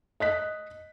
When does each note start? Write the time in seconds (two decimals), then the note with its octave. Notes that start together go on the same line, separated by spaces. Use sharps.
0.20 D#5 F#6 B6